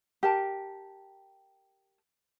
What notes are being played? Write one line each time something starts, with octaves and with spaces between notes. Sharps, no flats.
G4 A#4 A5